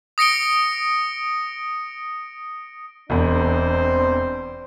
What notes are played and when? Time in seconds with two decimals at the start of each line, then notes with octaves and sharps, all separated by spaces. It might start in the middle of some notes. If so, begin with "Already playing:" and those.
0.18 D#6 A#6 C#7 D7 G7
3.10 E1 E2 C4 D4 C5